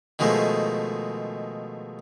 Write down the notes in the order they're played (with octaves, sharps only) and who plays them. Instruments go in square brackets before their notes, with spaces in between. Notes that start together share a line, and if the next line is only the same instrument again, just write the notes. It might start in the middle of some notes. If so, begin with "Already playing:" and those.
[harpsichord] B2 D#3 F3 G#3 A3